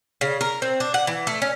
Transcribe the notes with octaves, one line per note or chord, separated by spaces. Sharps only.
C#3
A#4
C4
D4
F#5
E3
A3
C#4